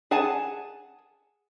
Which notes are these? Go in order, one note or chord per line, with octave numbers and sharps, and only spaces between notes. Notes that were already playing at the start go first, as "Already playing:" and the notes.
G#4 F#5 G#5 A5